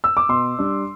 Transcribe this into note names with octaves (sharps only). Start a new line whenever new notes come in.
E6
D6
B2 C6
G3 D4